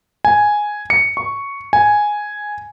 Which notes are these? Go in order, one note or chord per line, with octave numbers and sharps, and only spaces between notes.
G#5
C#7
C#6
G#5